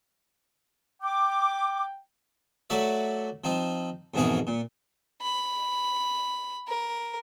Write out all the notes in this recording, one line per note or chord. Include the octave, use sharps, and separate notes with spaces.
G5 D6
F#3 A3 F#4 D5 E5
F3 C4 D#4
F2 G#2 B2 E3 G#4 A#4
A#2
B5
A#4